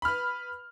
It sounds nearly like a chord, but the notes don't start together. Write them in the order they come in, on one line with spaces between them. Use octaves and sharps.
B5 F6 B4